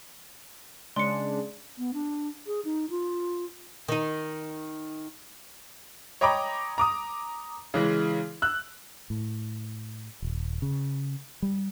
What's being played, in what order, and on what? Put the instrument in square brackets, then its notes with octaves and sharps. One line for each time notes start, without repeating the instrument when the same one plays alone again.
[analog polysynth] C#3 G#3 D4 [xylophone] C6 C#7
[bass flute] B3
D4
G#4
D#4
F4
[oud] D#3 D#4
[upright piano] C#5 D#5 G5 A#5 B5 D6
A#5 D6 D#6
C#3 E3 G#3
E6 F#6
[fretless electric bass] A2
D#1
C#3
G3